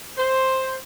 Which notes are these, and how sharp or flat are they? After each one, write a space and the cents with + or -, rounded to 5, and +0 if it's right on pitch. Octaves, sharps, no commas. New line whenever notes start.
C5 +5